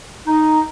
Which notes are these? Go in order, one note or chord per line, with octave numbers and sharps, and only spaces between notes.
D#4